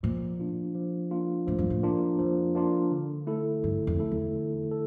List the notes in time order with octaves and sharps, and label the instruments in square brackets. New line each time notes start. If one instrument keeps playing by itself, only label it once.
[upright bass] A#2 [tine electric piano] F3
[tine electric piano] A#3 D4 F4
F3
A#3 D4 F4
[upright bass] A2 [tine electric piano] F3
[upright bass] G2
A2
[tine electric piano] A#3 D4 F4
[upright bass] F2 [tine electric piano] F3
[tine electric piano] A#3 D4 F4
D3
A3 E4 A4
[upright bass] G2 [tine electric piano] D3
[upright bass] F2
[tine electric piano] A3 E4 A4
[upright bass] E2
[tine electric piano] D3
A4